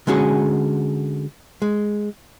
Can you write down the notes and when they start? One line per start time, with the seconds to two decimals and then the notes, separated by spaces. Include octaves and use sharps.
0.07 D3 G#3 C#4 F#4 G#4
1.62 G#3